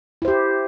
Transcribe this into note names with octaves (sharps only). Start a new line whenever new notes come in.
E4 G4 C5